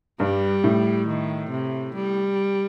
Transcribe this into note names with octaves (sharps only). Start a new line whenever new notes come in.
G2 G3
A2
D#3
C3
G3